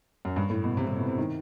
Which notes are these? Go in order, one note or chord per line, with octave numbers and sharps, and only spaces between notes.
F#2
G2
A2
B2
C3
C3
B2
C3
D#3